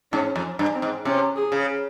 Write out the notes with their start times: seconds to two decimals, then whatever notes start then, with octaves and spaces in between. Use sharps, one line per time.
0.12 G#2 C#4
0.36 F2
0.59 G2
0.74 C4
0.82 G#2
1.05 C3 C#4
1.36 G#4
1.52 C#3